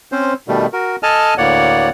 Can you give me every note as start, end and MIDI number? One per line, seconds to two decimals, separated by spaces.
0.12 0.34 60
0.12 0.34 61
0.12 0.34 72
0.48 0.66 47
0.48 0.66 51
0.48 0.66 55
0.48 0.66 57
0.73 0.96 66
0.73 0.96 70
1.03 1.34 69
1.03 1.34 75
1.03 1.34 80
1.03 1.34 81
1.03 1.34 89
1.38 1.89 38
1.38 1.89 45
1.38 1.89 58
1.38 1.89 73
1.38 1.89 74
1.38 1.89 78